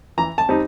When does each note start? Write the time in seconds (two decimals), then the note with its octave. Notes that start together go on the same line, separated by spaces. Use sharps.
0.18 E3 A#5
0.38 A5
0.49 G3 C4 D#4